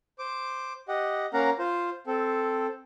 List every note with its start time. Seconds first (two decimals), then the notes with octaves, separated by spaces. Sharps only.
0.19 C5 D6
0.88 G4 D#5 F#5
1.33 A#3 C#4 A#4 F5 F#5 A#5
1.59 F4 C5
2.07 C4 A4